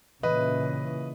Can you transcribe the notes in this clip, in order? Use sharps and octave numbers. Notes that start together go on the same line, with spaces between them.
A#2 C#3 E3 B4 D#5